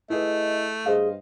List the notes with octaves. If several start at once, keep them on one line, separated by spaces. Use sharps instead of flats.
A3 E4 G#4 B4 D#5
G2 G#4 C5 D#5 F5